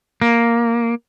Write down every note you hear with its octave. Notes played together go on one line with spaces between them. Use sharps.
A#3